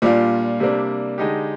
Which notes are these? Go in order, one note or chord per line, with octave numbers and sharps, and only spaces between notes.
A#2 G3 D4 F4
C3 G3 A#3 D4
D3 G#3 D#4 G4